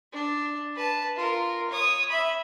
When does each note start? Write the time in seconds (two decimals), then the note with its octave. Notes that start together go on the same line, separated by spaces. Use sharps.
0.13 D4
0.76 B4 A5
1.16 F4 A#4
1.70 C#5 D#6
2.10 E5 B5